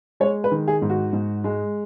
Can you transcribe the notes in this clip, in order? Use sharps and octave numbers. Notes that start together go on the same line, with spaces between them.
G#3 C#5
B4
D#3
G#4
G#2
F#4
G#2
G#3